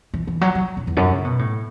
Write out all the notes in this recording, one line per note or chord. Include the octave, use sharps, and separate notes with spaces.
E3
E3
F#3
F#3
F#2
E2
F#2
C#3
B2
A2